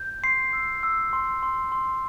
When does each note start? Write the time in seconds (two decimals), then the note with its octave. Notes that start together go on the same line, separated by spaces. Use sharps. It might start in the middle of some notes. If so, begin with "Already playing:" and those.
Already playing: G6
0.23 C6 C7
0.53 E6
0.83 E6
1.13 C6
1.43 C6
1.72 C6